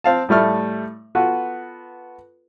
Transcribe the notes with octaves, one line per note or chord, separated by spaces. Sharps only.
C4 F5 A5
A2 G3 A3 F6
B3 F4 F#4 A4 B4